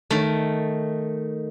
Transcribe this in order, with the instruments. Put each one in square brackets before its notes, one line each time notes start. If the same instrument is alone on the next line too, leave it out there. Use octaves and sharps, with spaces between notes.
[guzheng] D#3 A3